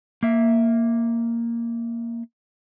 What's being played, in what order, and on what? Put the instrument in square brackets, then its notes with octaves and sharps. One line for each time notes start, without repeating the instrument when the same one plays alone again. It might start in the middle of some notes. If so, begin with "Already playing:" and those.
[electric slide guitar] A#3 E5